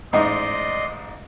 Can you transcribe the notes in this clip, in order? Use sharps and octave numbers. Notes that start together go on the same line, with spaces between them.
A1 G#2 D#4 D5 D#5 C6